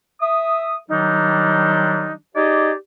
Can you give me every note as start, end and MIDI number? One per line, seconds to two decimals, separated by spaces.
0.21 0.76 76
0.21 0.76 87
0.89 2.13 51
0.89 2.13 54
0.89 2.13 55
0.89 2.13 62
0.89 2.13 63
2.36 2.72 63
2.36 2.72 67
2.36 2.72 68
2.36 2.72 74
2.36 2.72 75